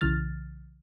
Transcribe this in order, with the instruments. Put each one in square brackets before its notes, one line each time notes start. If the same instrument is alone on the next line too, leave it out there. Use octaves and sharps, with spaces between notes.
[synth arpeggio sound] B1 C#3 E3 F6 A6